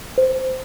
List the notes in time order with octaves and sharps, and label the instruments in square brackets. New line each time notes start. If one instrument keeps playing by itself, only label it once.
[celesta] C5